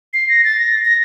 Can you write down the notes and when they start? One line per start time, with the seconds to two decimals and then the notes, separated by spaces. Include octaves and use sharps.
0.14 C7
0.29 A#6
0.44 A6
0.60 A#6
0.85 A#6